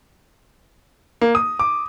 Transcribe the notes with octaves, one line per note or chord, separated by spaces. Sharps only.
A#3
D#6
D6